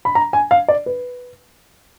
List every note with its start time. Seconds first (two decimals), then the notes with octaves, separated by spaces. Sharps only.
0.05 B5
0.15 A#5
0.33 G#5
0.51 F5
0.68 D5
0.86 B4